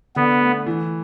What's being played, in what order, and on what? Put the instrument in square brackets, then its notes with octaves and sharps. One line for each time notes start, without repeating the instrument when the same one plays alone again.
[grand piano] D3 [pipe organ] B3
[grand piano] A3
E3